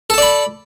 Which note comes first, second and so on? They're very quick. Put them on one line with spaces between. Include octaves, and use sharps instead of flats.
A4 A5 D5 B5